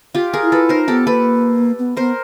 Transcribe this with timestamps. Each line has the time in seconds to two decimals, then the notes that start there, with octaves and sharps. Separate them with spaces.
0.15 F4 G4
0.33 G#4 A#4
0.42 E4
0.52 A4 B4
0.69 D#4 A#4 C5
0.88 B3 G4 A4
1.06 A#3 A4 B4
1.78 B3
1.97 B3 A#4 C5